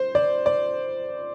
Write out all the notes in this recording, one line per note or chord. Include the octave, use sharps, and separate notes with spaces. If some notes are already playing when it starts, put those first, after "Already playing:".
Already playing: C5
D5
D5